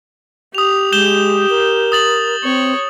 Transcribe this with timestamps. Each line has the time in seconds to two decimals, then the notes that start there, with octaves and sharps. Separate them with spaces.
0.55 G4 D#6 F7
0.92 G#3 G6 E7 G7
1.50 A#4
1.92 D#6 A6 F#7
2.43 C4 C#5